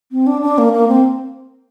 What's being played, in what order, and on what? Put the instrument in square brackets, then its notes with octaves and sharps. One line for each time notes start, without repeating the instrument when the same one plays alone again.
[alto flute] C4
D4
D4
A#3
A#3
C4